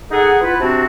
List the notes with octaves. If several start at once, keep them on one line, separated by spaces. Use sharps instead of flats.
D#4 G#4 A4 F#5
B3 E4 F4 B4
C3 C4 D4 F#4